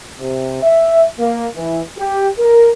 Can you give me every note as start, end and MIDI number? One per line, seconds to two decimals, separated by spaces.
0.20 0.60 48
0.63 1.06 76
1.19 1.47 58
1.56 1.81 52
1.98 2.29 67
2.39 2.70 70